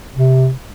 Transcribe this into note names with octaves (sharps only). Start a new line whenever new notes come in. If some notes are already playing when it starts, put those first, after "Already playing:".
C3